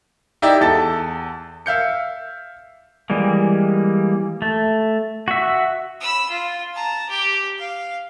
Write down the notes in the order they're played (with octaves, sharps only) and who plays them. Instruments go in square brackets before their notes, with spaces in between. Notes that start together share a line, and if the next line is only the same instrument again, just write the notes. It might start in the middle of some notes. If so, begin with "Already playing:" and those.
[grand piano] D#4 E4 G4 D5 E5
E2 A4 A6
E5 F5 G6 C#7
[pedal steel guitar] E3 G3 G#3 A#3
A3
F#4 E5
[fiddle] B5 E6
F4
A5 A#5
G4 D6
F5